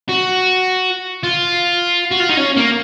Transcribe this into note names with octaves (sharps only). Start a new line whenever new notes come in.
F#4
F4
F#4
F4
D#4
C#4
A#3